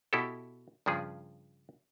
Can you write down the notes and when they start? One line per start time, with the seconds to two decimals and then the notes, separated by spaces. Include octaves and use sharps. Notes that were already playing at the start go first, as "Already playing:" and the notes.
0.13 B2 E4 G4 A4
0.86 G2 C#3 F3 G#4